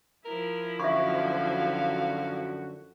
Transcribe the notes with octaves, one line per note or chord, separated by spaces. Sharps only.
F3 E4 A#4
F#2 D3 F#4 E5 F5 C#6